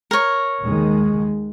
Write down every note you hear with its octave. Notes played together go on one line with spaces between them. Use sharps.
A#4 C#5
D#2 D#3 G#3